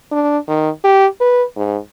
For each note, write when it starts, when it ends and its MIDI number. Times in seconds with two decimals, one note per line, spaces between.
0.11 0.38 62
0.48 0.70 51
0.84 1.07 67
1.21 1.44 71
1.57 1.78 44